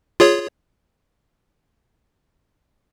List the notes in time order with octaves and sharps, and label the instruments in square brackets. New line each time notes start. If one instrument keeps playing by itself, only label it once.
[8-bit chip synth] F4 G#4 C#5